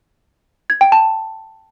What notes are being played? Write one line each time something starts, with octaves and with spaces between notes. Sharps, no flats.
G#6
G5
A5